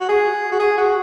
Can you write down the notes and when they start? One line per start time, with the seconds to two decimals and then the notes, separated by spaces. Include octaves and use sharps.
0.01 F#4
0.09 G#4
0.52 F#4
0.60 G#4
0.78 F#4